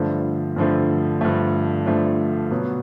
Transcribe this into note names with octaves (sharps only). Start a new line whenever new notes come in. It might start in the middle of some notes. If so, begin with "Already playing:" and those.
Already playing: G2 D3 F3 A3
G2 D3 F3 A3
G2 D3 F3 A3
G2 D3 F3 A3
B2 F#3 B3